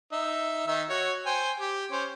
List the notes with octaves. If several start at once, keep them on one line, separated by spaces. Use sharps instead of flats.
D#4 E5
D#3 D#4 E5
F#4 C#5
C5 G5 G#5
G4
C#4 C5